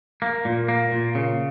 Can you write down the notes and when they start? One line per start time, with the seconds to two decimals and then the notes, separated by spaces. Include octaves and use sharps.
0.22 A#3
0.45 A#2
0.68 A#3
0.91 A#2
1.15 C#3